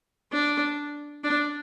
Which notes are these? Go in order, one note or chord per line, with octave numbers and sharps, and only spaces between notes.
D4
D4